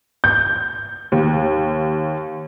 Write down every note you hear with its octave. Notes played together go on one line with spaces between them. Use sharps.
G6
D#2